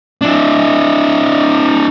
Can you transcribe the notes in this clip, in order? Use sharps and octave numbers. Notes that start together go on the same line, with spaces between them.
D4 E4